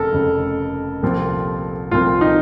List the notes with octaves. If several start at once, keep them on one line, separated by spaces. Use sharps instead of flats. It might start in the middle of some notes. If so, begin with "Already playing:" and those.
Already playing: F1 F2 C#3 A4 A#4
F1 F2 C#3
C2 A#2 F3 C4
C2 A#2 F3 C4 F4
D#4